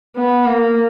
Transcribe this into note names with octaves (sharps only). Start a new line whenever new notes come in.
B3
A#3